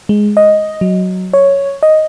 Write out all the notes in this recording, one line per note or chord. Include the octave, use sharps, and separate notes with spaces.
G#3
D#5
F#3
C#5
D#5